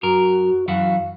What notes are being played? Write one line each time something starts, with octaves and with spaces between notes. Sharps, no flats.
F#2 F#4 A#4
F#2 E3 F#4 F5